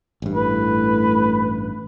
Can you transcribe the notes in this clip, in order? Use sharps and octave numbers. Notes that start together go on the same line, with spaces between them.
A1 G2
A2 B4